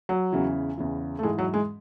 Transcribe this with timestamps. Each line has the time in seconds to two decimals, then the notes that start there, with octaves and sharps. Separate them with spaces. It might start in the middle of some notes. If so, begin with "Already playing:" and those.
0.09 F#3
0.32 E2 C#3 E3
0.78 E2 C#3 E3
1.19 A3
1.23 G#2 E3 G#3
1.38 F#3
1.54 G#3